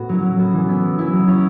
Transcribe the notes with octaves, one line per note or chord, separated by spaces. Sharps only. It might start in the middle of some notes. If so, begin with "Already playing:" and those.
Already playing: A2 B3 F#4
F#3 C#4 E4
F#3
B3 F#4
E3
B3 E4
F#3
B3 E4
F#3
C#4 E4